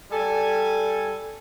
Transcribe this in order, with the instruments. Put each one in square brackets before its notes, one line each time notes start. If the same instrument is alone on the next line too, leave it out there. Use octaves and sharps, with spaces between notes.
[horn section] G3 A4 G#5